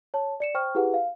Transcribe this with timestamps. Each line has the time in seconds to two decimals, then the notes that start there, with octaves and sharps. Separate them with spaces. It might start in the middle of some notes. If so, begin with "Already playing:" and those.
0.14 C#5 A5
0.40 D5 C#7 E7
0.54 C5 G5 C#6 F6
0.75 E4 G4 G#4 B4 F#5
0.94 F5